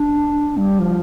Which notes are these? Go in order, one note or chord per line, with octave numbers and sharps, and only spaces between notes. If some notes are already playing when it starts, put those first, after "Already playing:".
Already playing: D4
G3
F3